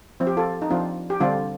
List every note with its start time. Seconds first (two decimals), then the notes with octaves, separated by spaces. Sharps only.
0.20 F3 C4
0.27 G4
0.37 F4 A4
0.62 D#4
0.70 F3 C4 D4 F4
1.10 G4
1.20 D3 G3 C4 D4 F4